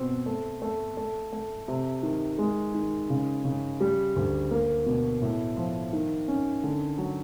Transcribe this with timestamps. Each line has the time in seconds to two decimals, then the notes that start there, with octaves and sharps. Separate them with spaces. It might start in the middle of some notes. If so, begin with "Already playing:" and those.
Already playing: B2 C4
0.26 A3
0.62 A3
0.97 A3
1.32 A3
1.68 C3
2.03 D#3
2.39 G#3
2.75 D#3
3.10 C#3
3.45 C#3
3.81 G3
4.16 D2
4.51 A#3
4.86 B2
5.22 A2
5.57 F3
5.93 D#3
6.28 C#4
6.63 D3
6.98 F#3